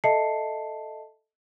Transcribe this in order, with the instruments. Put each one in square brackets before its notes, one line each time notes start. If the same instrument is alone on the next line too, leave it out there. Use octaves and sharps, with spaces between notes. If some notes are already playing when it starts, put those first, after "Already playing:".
[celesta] A4 D#5 E5 A5 C7 C#7